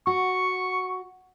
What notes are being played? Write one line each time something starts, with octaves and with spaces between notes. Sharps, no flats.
F#4 C#6